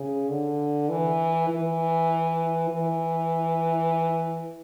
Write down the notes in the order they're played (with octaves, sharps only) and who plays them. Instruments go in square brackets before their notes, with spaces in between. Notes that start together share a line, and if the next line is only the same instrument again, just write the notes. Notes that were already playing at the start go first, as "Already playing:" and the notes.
Already playing: [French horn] C#3
D3
E3
E3
E3